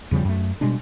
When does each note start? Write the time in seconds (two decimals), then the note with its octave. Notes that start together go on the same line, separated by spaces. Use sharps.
0.11 E2 C#3 F3 G3
0.25 F#2 A3
0.61 B2 G3 G#3 D4